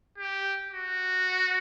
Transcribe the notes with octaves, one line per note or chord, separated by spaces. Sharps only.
G4
F#4